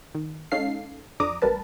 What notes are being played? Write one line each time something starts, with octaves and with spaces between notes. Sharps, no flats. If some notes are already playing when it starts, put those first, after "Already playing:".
D#3
G#3 C#4 D#4 A4 F5 C7
F2 D4 A#5 D6 D#6
A1 G3 A#4 B4 A5